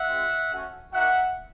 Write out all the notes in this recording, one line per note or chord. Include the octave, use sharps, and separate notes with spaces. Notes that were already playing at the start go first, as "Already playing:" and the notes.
Already playing: E5 F#5
G#3 C4 F4
A3 C#4 F#4
A#3 D#4 F#4 E5 F#5